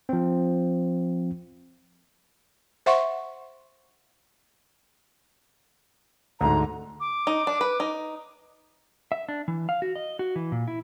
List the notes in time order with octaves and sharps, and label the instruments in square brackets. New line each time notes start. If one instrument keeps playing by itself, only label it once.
[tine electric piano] F3 C4
[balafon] C5 E5 F#5 C6 C#6
[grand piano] D2 G#2 [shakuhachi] A#5
[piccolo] D6
[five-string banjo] D#4
D4
B4
D#4
[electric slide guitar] E5
D4
E3
F5
F#4
D#5
F#4
E3
A#2
E4